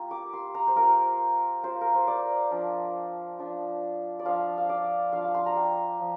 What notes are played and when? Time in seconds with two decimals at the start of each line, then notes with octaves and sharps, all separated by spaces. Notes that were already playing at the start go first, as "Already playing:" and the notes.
Already playing: A#3 F4 G4
0.11 D6
0.33 C6
0.55 A#5
0.67 C5
0.76 A#3 F4 A#4
1.63 A#3 F4 C5
1.81 A#4
1.94 C5
2.08 D5
2.51 F3 D4 F4
3.38 F3 D4 F4
4.19 D5
4.25 F3 D4 F4 F5
4.58 F5
4.69 D5
5.13 F3 D4 F4 F5
5.24 D6
5.34 C6
5.46 A#5
5.56 G5
6.00 F3